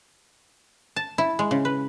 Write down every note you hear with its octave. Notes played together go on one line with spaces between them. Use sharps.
A5
E4
G#3
C#3
B4